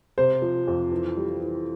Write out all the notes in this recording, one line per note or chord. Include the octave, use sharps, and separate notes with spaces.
C3 C5
F3
F2
E3
G3
E3